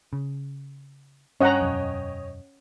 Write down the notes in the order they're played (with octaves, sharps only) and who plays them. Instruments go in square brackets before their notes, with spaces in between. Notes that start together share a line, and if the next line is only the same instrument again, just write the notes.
[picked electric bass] C#3
[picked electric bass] G2 [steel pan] C#4 F#5 A#5 [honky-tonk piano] C#5 D#5 G5
[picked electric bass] E1 F#2